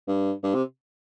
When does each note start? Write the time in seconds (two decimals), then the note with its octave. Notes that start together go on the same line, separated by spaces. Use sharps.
0.08 G2
0.43 G2
0.54 C3